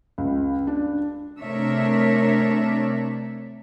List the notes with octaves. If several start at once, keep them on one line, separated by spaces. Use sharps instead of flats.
C#2
D4
C3 A3 D4 A#4 C#5 E5